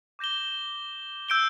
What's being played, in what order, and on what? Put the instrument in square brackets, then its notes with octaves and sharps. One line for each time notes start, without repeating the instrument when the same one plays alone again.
[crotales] D6 G6 A#6 E7 G7
E6 G6 D7 G7